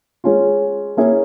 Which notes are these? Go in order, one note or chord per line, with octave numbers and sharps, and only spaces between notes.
G#3 C#4 F4
A#3 C#4 E4 G#4